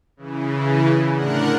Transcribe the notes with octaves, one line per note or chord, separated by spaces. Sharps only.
C#3 E3
A2 D3 D4 A#4 F#5